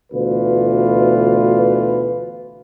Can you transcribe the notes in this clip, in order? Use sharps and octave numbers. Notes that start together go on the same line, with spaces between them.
D2 B2 E3 F4 B4